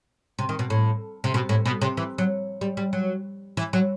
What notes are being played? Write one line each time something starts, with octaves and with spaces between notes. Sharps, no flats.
C3
D#3
B2
A2
C3
B2
A2
B2
C3
E3
F#3
G3
G3
F#3
E3
F#3